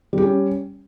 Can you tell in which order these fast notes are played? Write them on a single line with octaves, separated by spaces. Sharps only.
G3 G4 C#4